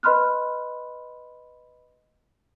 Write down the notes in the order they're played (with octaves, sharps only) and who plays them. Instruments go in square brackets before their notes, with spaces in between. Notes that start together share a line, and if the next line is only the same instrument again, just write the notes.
[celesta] B4 D#5 B5 C6 F6 F#6